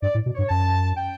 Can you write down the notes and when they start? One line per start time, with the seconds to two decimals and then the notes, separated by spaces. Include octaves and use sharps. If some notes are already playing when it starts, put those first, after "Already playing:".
0.02 G2 D5
0.15 A2
0.26 B2
0.34 G2 C#5
0.49 F#2 A5
0.97 G5